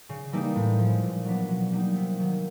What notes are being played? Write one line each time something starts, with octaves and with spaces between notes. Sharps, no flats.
C#3
E3 G3 A#3 D#4
A2
F3
G#3
A#2
F#3 B3 D4
B2
G3 A#3 D#4
C3
D#3 F#3